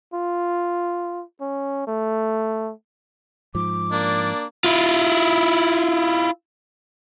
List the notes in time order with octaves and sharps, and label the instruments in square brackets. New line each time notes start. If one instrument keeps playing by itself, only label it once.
[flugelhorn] F4
C#4
A3
[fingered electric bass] G#2 F3 [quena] D6
[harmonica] A#3 D4 [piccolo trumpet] D5
[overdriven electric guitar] E4 F4